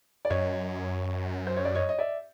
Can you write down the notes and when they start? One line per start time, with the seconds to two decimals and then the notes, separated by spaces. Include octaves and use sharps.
0.25 D5
0.30 F#2 C#5 D#5
1.47 C5
1.57 C#5
1.65 D5
1.75 C#5 D#5
1.89 D#5
1.99 D5 E5